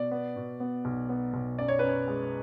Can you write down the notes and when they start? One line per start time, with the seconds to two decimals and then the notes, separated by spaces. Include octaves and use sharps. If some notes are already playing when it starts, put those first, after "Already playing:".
Already playing: B2 D5
0.11 B3
0.36 B2
0.60 B3
0.85 B1
1.09 B3
1.34 B1
1.58 F#2 D5
1.68 C#5
1.79 F#2 B4
1.89 C#5
2.08 G#3